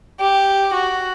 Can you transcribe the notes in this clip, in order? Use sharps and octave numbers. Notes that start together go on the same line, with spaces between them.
G4
F#4